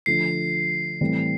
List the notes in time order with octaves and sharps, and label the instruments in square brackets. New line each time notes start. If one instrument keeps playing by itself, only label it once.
[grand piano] D3 F3 A3 [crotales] C7
[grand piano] A2 E3 G3 C4